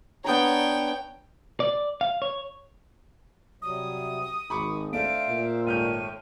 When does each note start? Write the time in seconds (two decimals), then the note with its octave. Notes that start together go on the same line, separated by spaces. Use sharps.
0.24 B3 D4 C#5 G5 A#5
1.60 D5
2.01 F5
2.22 C#5
3.62 C3 F#3 G3 D#6
4.50 G#1 D#3 B5 C#6 D6
4.93 A3 D4 C5 E5 F5 D7
5.28 A#2
5.67 G#1 A3 C#5 G5 F6 G6 D#7